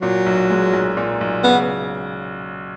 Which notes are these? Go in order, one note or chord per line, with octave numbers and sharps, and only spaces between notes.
A#2 F#3
B1
G#3
B1
A#2
B1
C#3 B3